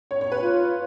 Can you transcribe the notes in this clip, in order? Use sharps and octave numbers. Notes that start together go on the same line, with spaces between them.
C#5
C#5
B4
F4